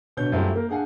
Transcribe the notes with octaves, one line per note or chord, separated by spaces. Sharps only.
B2 D3 C#5 G6
F#2 G3 A3 C4 E4 F4
A#3 A#4
D4 G#4 F5 F#5 G#5